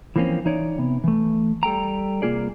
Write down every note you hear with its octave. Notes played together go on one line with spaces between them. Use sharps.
E3 F3 A#3 C4 C#4
E3 D#4 C#5 D5
C3 B3
E3 A3
G3 A4 G5 A#5
C2 A#3 F4 G#4 D5